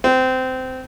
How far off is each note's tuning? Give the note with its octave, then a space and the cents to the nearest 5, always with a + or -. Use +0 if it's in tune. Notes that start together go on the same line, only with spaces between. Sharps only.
C4 -20